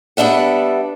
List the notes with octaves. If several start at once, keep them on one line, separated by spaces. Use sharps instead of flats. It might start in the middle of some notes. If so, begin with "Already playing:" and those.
G3 B3 D4 E5 F#5